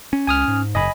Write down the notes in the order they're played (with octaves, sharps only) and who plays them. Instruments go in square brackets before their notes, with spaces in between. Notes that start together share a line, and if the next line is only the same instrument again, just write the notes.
[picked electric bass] C#4
[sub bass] C#2 [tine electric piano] G#5 D#6 F6
[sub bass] G#2
[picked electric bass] F#1 [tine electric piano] D#5 G#5 B5